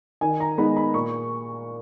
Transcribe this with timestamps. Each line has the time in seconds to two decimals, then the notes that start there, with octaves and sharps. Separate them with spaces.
0.21 D#3 G#5
0.40 A#5
0.58 G#3 B3 D#4 B5
0.77 B5
0.94 A#2 C#6